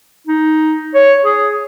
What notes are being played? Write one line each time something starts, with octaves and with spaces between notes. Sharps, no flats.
D#4
C#5
G#4